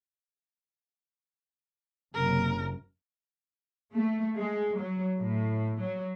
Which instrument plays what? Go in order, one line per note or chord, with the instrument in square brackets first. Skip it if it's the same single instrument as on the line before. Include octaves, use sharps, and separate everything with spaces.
[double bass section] F#1 F#2 C3 [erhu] A#4
[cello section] A3
G#3
F#3
A2
F#3